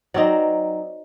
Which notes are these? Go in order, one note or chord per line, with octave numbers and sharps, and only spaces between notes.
F#3 C4 D#4 D5